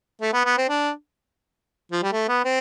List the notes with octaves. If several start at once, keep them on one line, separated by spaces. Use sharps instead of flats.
A3
B3
B3
C4
D4
F3
G3
A3
B3
C4